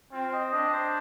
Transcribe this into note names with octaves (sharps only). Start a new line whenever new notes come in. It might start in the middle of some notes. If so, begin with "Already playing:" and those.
C4 F4
D#5
D4 D#5
C5